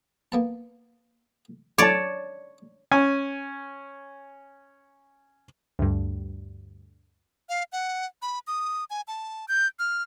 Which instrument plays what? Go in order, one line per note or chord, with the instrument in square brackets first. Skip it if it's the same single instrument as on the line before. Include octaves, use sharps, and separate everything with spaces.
[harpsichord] A#3 B3 A5
[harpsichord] F#3 A3 E4 [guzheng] C#5 D5 [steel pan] A5 D6
[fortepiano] C#4 G#5
[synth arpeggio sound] D2 G2
[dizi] F5
F#5
B5
D#6
G#5
A5
G6
F6